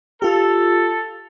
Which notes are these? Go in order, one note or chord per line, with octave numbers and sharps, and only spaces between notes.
F4 G4 A4